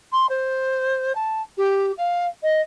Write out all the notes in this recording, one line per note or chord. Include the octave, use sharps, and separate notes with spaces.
C6
C5
A5
G4
F5
D#5